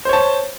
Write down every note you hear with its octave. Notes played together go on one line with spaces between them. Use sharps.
C5 C#5 A5